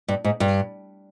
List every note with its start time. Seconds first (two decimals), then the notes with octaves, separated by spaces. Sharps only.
0.08 G2
0.24 G#2
0.40 G2